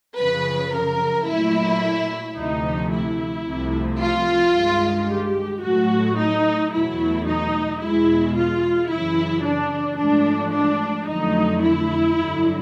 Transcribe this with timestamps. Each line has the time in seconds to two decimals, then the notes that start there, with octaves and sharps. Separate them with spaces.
0.18 F#2 C#3 F3 B4
0.73 A#4
1.27 A#2 F#3 A3 E4
2.36 D2 C3 F3 A3 D#4
2.91 E4
3.45 C2 C3 F3 A3
4.00 F4
4.54 G2 D#3 G#3
5.08 G4
5.62 A2 F#3 A3 F#4
6.17 D#4
6.71 E2 B2 F#3 A3 E4
7.26 D#4
7.80 E2 B2 G#3 E4
8.34 F4
8.89 F#2 C#3 E3 E4
9.44 D4
9.97 G#2 F3 A3 D4
10.52 D4
11.06 F2 D3 F#3 A3 D#4
11.61 E4
12.15 G2 D3 F#3